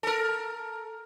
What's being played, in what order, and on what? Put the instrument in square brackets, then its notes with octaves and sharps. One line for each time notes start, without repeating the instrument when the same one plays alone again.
[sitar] A4 A#4